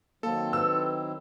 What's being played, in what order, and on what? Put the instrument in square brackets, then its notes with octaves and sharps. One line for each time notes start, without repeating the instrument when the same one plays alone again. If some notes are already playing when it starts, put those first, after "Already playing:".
[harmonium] D#3 F#3 C4 [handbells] A#3 [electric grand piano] A4
[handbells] B4 C5 [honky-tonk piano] E6
[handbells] E4